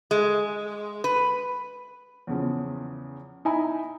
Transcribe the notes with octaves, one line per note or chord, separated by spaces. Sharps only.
G#3
B4
E2 C#3 F3
D#4 E4 G#5 A#5 B5